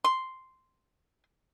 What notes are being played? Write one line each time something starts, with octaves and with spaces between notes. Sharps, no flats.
C6